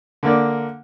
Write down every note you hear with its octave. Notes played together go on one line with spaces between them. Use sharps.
D3 A#3 D5